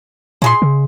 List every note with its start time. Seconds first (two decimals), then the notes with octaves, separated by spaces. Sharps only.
0.42 A#2 G#3 G#4 C6
0.62 C#3